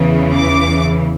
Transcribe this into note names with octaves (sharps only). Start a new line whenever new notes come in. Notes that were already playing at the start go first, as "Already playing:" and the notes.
Already playing: E2 C#3 E3
D6